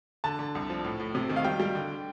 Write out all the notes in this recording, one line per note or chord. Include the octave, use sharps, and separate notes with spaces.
D3 A5
D3
C2
F3
A2
A2
C3
D#3
F5
G3 G5
G3
D3